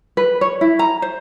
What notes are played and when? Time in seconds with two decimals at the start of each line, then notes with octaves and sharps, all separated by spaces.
0.17 B4
0.41 C#5
0.61 E4
0.79 A#5
1.02 C5